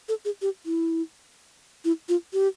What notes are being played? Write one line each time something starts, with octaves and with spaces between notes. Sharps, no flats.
A4
G#4
G4
E4
E4
F4
G4